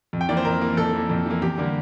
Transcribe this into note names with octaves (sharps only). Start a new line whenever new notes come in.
F2
G5
E3 A#3 D5
C5
F2 A#4
E3 A#3
F2 A4
E3 A#3
F2
E3 A#3
E2 G4
D3 G3 A#3